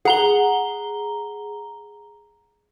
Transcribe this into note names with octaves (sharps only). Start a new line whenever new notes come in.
G#4 F#5 A#5 G7